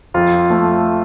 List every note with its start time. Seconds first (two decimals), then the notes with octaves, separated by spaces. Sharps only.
0.14 F2 F4
0.50 F3 A3